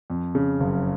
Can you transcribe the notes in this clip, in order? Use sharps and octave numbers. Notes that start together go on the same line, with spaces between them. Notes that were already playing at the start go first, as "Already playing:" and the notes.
F2
C#3
F#1